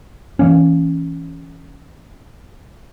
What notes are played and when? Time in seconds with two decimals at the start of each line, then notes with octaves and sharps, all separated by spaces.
0.39 E3 F3 A#3 C#4